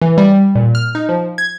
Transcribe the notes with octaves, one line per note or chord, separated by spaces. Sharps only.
E3
G3
A#2
F6
D#4
F3
G#6